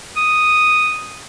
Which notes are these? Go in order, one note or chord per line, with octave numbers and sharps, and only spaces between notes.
D#6